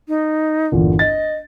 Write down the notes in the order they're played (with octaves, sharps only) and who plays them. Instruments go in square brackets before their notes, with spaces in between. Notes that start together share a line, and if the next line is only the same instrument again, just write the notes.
[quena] D#4
[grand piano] G1 E2 A#2
[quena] D#5 [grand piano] A6